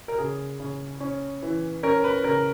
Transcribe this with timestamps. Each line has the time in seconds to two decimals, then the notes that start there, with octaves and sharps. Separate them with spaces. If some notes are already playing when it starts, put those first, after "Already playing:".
0.08 A#4
0.18 C#3 G#4
0.60 C#3
1.00 C#4
1.42 E3
1.83 C#4 A#4
2.04 B4
2.24 C#3 A#4